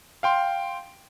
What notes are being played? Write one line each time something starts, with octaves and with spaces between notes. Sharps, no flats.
F5 G5 C6